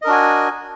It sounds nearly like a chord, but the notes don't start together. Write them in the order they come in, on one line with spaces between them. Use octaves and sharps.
D#5 A#4 D4 F#4 G#5